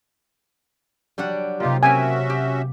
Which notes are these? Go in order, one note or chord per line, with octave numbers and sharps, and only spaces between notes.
F#3 G3 D4 F#5
C3 A#3 D#4 F4 G4
C4 C#4 F#4 G4 A#4 E5 G#5
G4